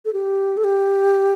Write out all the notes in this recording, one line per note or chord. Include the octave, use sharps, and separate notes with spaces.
A4
G4
A4
G4